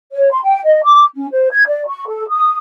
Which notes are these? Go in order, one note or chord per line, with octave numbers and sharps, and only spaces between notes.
C#5
C6
G5
D#5
D6
C#4
C5
G#6
D5
C#6
A4
D#6